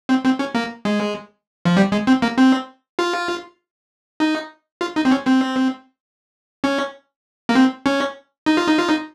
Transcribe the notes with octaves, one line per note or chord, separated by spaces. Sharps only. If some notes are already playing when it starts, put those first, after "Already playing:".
C4
C4
C#4
A#3
G#3
F3
G3
G#3
C4
A#3
C4
F4
D#4
F4
D#4
C4
C#4
C4
C#4
A#3
C4
C#4
D#4
F4
D#4
F4
D#4